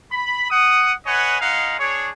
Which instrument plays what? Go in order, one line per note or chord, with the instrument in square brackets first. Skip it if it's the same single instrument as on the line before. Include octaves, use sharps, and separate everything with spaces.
[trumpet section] B5
F#5 D#6
B4 C#5 D#5 F#5 G#5
G#3 D#4 F5 F#5
D4 G#4 C#5